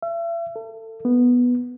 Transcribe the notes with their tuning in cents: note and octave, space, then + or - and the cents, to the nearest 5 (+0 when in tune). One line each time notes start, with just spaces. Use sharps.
E5 +40
A4 +25
B3 -5